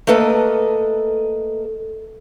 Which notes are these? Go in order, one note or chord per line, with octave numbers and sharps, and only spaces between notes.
A3 A#3 A4 B4 D#5